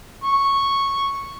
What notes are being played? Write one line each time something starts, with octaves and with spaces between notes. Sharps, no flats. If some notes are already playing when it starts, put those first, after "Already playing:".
C#6